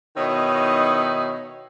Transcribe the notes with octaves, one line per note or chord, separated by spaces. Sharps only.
B2 D#3 D#4 E4 C#5 D#5